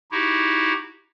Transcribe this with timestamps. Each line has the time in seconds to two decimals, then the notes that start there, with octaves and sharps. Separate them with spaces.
0.12 D#4 E4 F#4 G4